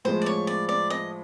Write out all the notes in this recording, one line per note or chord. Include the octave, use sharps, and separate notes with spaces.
A2 F3 G#3 C5
D5
C#5
D5
D5
D#5